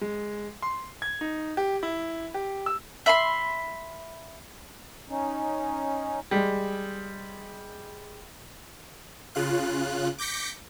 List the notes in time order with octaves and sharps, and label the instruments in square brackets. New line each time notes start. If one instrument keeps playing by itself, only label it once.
[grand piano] G#3
C6
G#6
D#4
G4
E4
G4
E6
[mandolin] E5 B5 C6
[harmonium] C#4 D#4
[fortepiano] G3 G#3
[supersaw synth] C#3 F4 F#6
D6 G6 A#6 B6 C#7